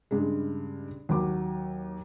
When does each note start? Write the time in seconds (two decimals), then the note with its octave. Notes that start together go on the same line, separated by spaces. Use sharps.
0.11 G2 C#3 G#3
1.09 D#2 F#3 D6